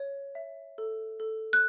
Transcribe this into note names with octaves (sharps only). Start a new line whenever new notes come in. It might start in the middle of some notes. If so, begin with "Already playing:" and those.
Already playing: C#5
E5
A4
A4
F#6